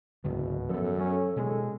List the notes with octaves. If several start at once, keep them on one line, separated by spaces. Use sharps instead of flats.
F#1 C#2 G#2 B2 D3
F#2 F3 B3 A4
F#3 C#4
D#1 B2 G#3